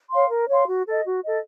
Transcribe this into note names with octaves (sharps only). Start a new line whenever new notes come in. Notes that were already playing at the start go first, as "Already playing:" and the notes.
C#5 F5 C6
A#4
C#5 F5 C6
F#4
A4 D#5
F#4
A4 D#5